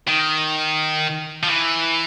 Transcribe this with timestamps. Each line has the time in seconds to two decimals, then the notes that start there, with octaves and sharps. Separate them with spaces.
0.08 D#3
1.43 F3
1.48 E3